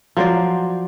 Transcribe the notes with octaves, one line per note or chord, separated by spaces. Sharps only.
F3 F#3 C5 D5